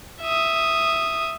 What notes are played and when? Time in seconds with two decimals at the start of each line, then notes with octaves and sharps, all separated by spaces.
0.22 E5 D#6